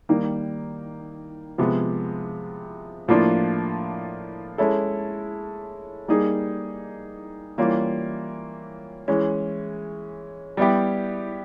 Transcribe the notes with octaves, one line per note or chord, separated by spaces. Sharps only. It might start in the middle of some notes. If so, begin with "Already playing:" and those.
D#3 G3 A#3 D#4
C3 F3 G#3 B3
A2 F3 A#3 D4 F4
G#3 C#4 E4 A4
G3 A#3 D#4 G#4
E3 G3 A#3 C#4 F4
E3 G#3 C#4
G3 B3 E4 G4